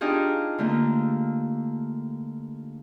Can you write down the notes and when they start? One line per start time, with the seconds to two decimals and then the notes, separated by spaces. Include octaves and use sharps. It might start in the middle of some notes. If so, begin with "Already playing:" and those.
0.01 D4 D#4 F4 G4 G#4
0.58 D3 A3 A#3